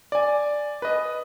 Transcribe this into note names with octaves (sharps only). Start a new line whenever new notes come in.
D5 G#5
B4 D#5